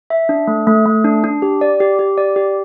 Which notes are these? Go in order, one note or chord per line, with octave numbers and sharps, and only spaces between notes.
E5
D4
A3
A3
A3
D4
D4
G4
D5
G4
G4
D5
G4